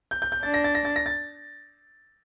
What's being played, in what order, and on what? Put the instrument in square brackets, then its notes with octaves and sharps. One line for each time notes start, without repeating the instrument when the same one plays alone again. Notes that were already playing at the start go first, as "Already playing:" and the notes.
[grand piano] G6
G6
G6
[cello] D4 [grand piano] A6
[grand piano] A#6
A6
A#6
A6
A#6
A6